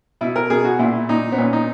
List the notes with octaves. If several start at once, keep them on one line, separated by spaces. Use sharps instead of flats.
B2 E4
A#4
B2 G#4
F#4
A#2 E4
A#2 D#4
B3
A#2 C#4
D#4